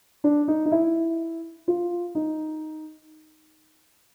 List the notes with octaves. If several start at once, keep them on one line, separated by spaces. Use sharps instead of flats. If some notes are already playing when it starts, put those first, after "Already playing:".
D4
D#4
D#4
E4
F4
D#4